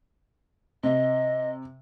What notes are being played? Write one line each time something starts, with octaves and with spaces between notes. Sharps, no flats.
C3 D#5